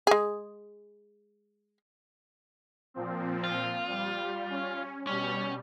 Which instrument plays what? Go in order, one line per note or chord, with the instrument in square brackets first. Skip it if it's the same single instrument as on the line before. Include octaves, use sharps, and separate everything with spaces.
[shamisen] G#3 G#4
[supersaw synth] A#2 F3 C4
[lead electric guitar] F4
[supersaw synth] G3
C#4
[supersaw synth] B2 G3 [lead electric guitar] C#4